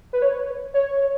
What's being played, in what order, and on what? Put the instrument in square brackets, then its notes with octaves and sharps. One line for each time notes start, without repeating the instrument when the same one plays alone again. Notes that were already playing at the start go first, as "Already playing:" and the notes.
[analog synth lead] B4
C#5
C#5